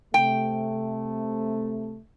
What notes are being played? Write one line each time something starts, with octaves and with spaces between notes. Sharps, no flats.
C3 A3 G5